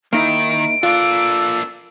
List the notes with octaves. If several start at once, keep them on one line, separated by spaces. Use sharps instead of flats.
D#3 A#3 D#4 E4 D7
A#3 D4 F4 A4